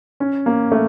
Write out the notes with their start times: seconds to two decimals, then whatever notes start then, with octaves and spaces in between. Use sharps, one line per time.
0.20 C#4
0.46 A#3
0.72 A3